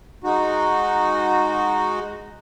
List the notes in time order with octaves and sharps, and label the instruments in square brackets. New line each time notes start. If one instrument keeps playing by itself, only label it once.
[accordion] G#3 D#4 F#4